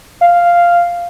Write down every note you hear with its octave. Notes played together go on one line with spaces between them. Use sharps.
F5